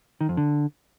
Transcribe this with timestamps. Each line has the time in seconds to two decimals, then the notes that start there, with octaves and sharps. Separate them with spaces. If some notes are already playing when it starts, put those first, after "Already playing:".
0.21 D#3
0.29 F2
0.37 D3